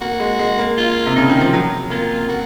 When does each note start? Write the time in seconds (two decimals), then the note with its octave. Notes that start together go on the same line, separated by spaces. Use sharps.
0.01 A#3 F#4
0.20 G#3
0.39 G#3
0.58 A#3
0.77 F4
1.06 C3
1.15 C#3 D#4
1.29 D#3
1.41 F3
1.53 F#3
1.90 A#3 F4
2.28 A#3 F#4